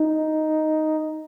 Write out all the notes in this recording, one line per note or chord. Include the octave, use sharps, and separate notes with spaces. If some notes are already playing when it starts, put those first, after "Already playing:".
Already playing: D#4